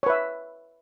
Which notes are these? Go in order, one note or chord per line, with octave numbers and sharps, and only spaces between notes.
B4 C#5 E5